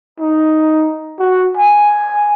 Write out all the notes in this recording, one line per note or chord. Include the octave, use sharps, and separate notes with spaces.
D#4
F#4
G#5